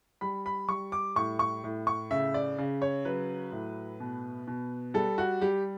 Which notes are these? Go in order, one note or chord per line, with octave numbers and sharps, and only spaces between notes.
G3 B5
B5
G3 C#6
D6
A2 C#6
C#6
A2
C#6
C#3 E5
D5
C#3
C#5
F#3 B4
A2
B2
B2
G3 A4
F#4
G3 G4